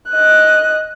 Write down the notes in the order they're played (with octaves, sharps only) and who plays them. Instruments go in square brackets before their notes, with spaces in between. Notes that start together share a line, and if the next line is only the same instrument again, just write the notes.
[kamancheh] D#5 F#6